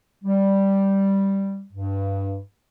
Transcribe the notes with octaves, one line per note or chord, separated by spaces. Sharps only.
G3
G2